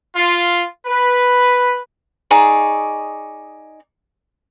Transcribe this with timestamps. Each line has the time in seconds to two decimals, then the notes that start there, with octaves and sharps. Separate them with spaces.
0.16 F4
0.86 B4
2.31 D#4 G#4 D5 C#6